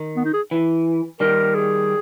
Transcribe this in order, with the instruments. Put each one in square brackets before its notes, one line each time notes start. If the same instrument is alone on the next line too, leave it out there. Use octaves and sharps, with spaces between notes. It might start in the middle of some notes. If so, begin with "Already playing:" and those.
Already playing: [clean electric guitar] D#3
[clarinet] B3
D#4
G#4
[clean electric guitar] E3
[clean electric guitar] D#3 G3 [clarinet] A#4
[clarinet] G#4